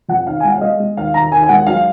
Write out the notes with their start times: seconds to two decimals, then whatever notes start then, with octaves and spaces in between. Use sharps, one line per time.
0.08 F2 F#5
0.27 D#3 F5
0.40 G#5
0.44 G#3 F#5
0.54 F5
0.61 G#3 D#5
0.80 G#3
0.97 D#2 F5
1.14 D#3 A#5
1.32 D#2 G#5
1.43 G#5
1.49 G#3 F#5
1.66 F#3 F5